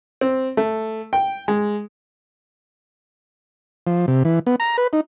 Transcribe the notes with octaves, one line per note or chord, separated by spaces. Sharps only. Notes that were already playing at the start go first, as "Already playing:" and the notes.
C4
A3
G5
G#3
F3
C3
E3
B3
A#5
B4
D#4